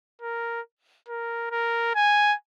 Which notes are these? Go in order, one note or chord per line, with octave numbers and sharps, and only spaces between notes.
A#4
A#4
A#4
G#5